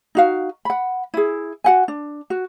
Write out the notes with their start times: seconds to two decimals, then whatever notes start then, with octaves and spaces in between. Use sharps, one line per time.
0.15 D#4 F#4 F5
0.65 F#5 B5
1.14 E4 G#4
1.64 F#4 F#5 G#5
1.88 D4
2.30 F#4